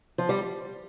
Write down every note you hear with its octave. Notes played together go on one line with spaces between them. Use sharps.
F3
G3